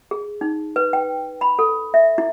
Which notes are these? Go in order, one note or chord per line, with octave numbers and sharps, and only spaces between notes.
G#4
D#4
B4
G5
B5
A4
E5
E4